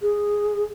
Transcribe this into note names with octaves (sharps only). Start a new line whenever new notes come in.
G#4